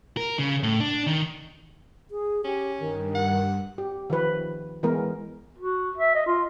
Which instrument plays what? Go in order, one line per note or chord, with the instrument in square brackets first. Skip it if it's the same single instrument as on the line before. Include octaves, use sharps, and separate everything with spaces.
[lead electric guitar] A#4
C#3
A2
D4
D#3
[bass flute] G#4
[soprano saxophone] C#4 [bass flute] G4
[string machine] G2 [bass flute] D#3
[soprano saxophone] F#5
[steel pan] G4
D#3 F3 B4
E3 G#3 B3 A#4
[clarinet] F#4
E5
D#5
F4